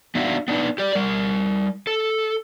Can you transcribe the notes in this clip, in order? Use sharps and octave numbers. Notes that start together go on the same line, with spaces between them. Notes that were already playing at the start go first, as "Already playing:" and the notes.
B3 D4 D#4 F#4 E5 F5
B3 D4 D#4 B4
G4 D5
G3 A#4
A4